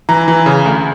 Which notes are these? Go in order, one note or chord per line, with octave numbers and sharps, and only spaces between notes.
E3 A#5
E3
C#3
D2